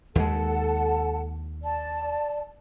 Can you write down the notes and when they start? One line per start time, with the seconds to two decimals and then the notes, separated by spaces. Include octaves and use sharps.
0.15 D#2 G#3 A4 F#5 A5
1.62 D5 A5